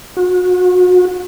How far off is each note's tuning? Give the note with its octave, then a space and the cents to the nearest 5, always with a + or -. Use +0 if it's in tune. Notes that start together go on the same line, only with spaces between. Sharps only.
F#4 -35